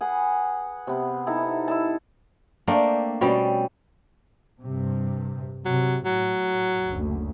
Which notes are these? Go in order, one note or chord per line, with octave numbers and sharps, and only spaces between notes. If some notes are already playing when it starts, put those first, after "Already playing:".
G#4 B4 F#5
C3 B3
D#4 E4 A4 A#5
E4 D#5 A5
A3 A#3 C4 D4
B2 G3 C4 C#4
G2 C3
C3 F#3
A2 F#3
F#1 D2